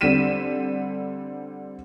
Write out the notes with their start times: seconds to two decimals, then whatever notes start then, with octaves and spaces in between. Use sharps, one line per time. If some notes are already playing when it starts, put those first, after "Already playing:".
0.01 D3 G3 C4 B6 D#7 E7